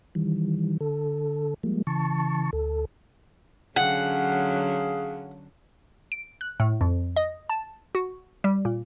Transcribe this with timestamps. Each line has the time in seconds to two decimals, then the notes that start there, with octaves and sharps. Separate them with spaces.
0.15 D#3 E3 G3
0.81 D3 A4
1.63 F3 G3 G#3 A#3
1.87 C#3 E3 A5 C#6
2.53 D2 A4
3.76 D3 F#3 C#4 G#4 F5 F#5
6.12 D7
6.41 F#6
6.60 A2
6.81 F2
7.16 D#5
7.50 A5
7.95 F#4
8.44 G3
8.65 A#2